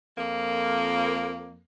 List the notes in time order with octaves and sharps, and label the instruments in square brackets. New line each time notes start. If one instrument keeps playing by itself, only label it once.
[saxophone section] F2 A#3